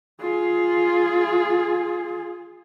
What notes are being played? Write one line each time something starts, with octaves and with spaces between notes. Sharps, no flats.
F4 G#4